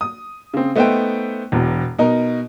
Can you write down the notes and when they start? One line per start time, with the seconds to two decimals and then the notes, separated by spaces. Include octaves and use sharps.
0.01 D#6
0.54 C#3 C4
0.76 A3 B3 D#4 C5 E5 G5
1.52 E1 E2
1.99 B2 D#4 A#4